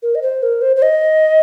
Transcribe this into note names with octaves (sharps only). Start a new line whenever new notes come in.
A#4
D#5
C5
A#4
C5
C5
D#5